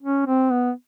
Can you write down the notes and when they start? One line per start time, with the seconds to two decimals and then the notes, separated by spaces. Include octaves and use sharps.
0.02 C#4
0.27 C4
0.51 B3